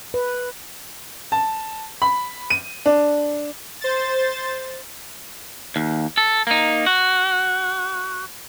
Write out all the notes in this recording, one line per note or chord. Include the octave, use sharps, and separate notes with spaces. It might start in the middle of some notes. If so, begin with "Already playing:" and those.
B4
A5
B5
D#7
D4
C5 A6
D#2
A4
A#3 D#4
F#4